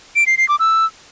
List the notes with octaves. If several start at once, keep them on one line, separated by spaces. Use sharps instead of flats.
D7
C7
C7
D6
E6